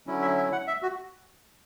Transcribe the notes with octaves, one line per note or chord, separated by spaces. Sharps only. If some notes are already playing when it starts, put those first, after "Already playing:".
D3 F#3 C#4 E4
E5
E5
F#5
E5
F#4